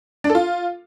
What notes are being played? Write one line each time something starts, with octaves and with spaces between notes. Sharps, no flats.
D4
A4
F4